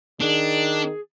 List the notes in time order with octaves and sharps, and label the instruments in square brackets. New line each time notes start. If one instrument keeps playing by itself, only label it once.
[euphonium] D#3 [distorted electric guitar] D4 [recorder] G#4